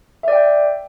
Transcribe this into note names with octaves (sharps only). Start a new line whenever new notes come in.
D5 E5 G5